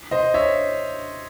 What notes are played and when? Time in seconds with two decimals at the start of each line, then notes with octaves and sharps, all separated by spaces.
0.11 C5 D#5
0.34 C#5 E5